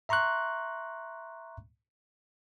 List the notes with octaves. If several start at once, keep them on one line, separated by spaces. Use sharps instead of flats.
E5 A#5 C6 C#6 F#6